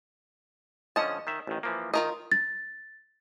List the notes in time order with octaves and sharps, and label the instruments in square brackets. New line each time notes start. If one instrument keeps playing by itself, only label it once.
[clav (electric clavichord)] D3 F3 C#4 [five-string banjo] D#5 A5
[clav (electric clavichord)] D#3 E5
A1 D#3
E3 F3 A#3
[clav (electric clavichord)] D#3 [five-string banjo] F4 A#4 D#5
[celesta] A6